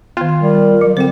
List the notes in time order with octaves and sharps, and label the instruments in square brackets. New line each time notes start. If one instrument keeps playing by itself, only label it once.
[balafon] D#3 B3 [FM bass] F4
[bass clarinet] G3 [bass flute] A#4
[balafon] F#3
[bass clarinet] D3 [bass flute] C4 [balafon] C5 G5